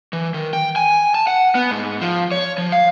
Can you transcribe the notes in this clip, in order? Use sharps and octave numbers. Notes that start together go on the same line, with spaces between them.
E3
D#3
G5
G#5
A5
F#5
B3
G#2
F3
C#5
F3
F5